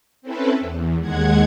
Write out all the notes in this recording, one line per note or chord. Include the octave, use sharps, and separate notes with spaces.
C4 C#4 E4 A4 B4
E2
D#2 G#3 F#5 G#6